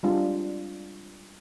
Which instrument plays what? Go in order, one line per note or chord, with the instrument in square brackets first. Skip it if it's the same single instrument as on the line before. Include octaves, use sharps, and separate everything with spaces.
[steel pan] G3 G#3 C4 D4 F4